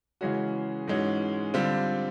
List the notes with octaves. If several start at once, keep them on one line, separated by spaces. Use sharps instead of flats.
C#3 E3 G#3 C#4 F#4
G#2 E3 G#3 C#4 F#4
D3 G3 C4 F4